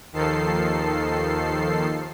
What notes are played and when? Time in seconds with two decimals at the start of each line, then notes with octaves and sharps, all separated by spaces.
0.13 D#2 D#3 F3 A4 C7